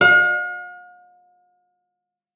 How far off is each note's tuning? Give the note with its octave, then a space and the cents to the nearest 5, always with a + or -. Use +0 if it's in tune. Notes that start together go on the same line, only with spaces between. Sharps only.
F5 +45